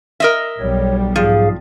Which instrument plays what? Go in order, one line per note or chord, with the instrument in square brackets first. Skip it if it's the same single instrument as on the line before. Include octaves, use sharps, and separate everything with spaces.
[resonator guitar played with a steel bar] A#4 D#5 E5
[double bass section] B1 G3 [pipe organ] C#5
[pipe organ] G#2 G#4 F5 [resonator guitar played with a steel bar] F3